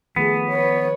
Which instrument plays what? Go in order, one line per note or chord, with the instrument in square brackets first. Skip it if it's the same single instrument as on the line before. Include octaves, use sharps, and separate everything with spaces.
[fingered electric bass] D#3 F3 [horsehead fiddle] A3 G#4 [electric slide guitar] B3
[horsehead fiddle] B4 C#5